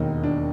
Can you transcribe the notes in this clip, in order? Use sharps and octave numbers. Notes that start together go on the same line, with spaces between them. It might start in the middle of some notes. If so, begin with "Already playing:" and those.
Already playing: E1 D#2 D#3 D#4
D4